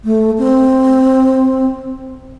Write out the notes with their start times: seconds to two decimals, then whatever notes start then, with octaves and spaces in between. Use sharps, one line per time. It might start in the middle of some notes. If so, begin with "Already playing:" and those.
0.05 A3
0.38 C4